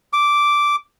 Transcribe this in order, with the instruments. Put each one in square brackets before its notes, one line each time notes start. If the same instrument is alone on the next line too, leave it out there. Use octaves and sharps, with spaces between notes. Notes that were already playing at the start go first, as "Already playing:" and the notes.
[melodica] D6